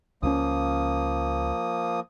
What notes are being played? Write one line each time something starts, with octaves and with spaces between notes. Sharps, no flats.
C#2 F3 G#3 A#3 C#4 D#6